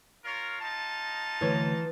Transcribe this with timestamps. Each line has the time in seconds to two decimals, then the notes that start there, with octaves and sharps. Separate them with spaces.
0.24 F4 A#4 C#5
0.61 D#4 F4 A5
1.41 D2 E3 C#5